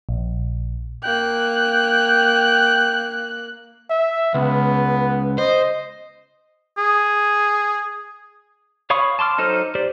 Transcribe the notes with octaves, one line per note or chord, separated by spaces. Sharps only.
A#1
A#3 G5 F#6
E5
C#2 B3
C5 D#5
G#4
C#5 F5 B5 C#6 D#6
A5 C6 D6 F6
F#3 D#4 A4 C5 F6
G4 C5 D5